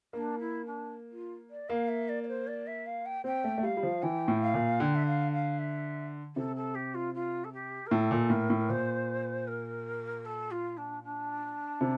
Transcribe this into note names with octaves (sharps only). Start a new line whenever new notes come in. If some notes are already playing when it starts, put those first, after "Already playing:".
A#3 D4
E4
D4
F4
D5
A#3 F5
E5
D5
D5
C5
D5
E5
F5
G5
C4 G5
A3
A3
G3 F5
G3
F3
E3 G5
A2
F5
A#2
D3 G5
E5
F5
F5
E5
C3 A4
A4
G4
F4
F4
A4
G4
A#4
A2 A4
A#2
A2 A#4
A2
A#2 C5
A#4
A4
F4
D4
D4
C3